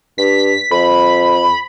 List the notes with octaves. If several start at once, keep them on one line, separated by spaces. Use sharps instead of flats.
G2 B6
F2 B5